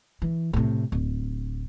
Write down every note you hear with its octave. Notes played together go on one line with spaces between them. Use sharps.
E3
A2 C3
D1